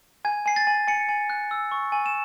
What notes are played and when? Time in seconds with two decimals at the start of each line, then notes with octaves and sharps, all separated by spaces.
0.25 G#5 G#6
0.46 G#5 C7
0.56 A6
0.67 G#5
0.87 G#5 C#7
1.09 G#5
1.30 F#6
1.51 E6
1.72 C#6
1.92 G#5
2.06 E7